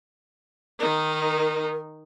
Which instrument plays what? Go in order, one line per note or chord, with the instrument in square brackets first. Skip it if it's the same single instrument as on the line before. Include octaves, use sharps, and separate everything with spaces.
[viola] D#3 D#4 [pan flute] A#4